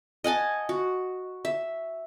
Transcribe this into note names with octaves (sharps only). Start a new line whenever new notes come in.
D#5 F#5 G#5 A5
F#4
E5